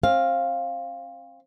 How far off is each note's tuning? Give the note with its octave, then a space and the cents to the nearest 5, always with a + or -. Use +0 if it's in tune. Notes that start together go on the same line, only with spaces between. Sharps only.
C4 +35 F5 +0